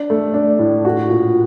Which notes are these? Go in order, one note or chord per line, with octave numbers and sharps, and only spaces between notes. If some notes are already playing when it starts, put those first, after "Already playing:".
Already playing: D4
A3
D4
A2
F#4
A#2